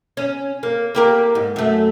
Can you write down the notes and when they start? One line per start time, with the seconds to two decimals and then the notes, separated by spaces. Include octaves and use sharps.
0.17 C#4
0.63 A#3
0.95 A#3 G4 A#4
1.35 G#2
1.56 F#2 A3